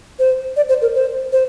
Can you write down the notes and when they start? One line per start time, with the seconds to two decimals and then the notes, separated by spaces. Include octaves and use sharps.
0.19 C5
0.56 D5
0.69 C5
0.82 A#4
0.94 C5
1.32 C5